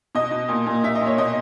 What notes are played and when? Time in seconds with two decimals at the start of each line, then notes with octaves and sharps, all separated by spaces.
0.15 B2 D#5
0.31 B2
0.49 A#2
0.66 A#2
0.84 A#2 E5
0.95 D#5
1.01 A#2
1.07 C#5
1.18 B2 D#5